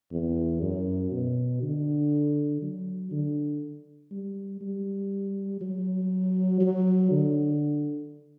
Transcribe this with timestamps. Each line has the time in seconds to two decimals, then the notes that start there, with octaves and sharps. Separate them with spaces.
0.12 E2
0.62 F#2
1.11 B2
1.62 D3
2.62 F#3
3.11 D3
4.11 G3
4.61 G3
5.61 F#3
6.61 F#3
7.11 D3